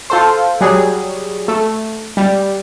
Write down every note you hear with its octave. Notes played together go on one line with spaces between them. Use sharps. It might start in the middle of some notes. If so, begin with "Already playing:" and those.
F4 A4 C5
F#3 G3 G#4
A3
G3